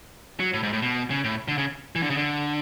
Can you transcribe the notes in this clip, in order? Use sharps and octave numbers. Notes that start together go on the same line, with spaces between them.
F#3
A2
G#2
A2
B2
C#3
A2
D3
C#3
E3
D3
C#3
D3